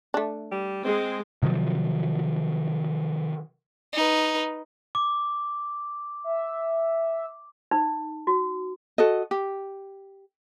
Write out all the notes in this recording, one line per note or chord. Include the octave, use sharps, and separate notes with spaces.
A3 D4
G3
G#3 C4
C3 D#3 F3 F#3
D#4 B4
D6
E5
D#4
F#4
F#4 A4 D#5
G4